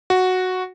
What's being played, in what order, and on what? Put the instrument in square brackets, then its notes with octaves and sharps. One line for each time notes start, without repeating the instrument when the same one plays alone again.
[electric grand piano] F#4